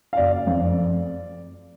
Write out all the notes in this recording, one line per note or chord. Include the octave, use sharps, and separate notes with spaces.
F5
F#1 D5
F2